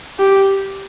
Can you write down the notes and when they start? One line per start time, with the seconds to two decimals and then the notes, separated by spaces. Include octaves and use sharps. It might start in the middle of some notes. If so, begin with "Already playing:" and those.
0.19 G4